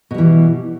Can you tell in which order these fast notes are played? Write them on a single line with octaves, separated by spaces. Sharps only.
B2 G3 E3